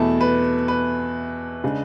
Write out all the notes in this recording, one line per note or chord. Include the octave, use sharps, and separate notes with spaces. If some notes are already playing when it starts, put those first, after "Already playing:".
Already playing: E2 B2 A3 E4 A5
B4
B4
C#3 G#3 D4